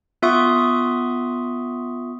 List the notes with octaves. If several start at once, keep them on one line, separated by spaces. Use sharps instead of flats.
B3 F4 E5 C6 C#6 D#6